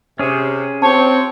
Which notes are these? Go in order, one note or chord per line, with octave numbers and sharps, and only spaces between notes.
C3 C#4 G#4
C4 F4 G4 C#5 A5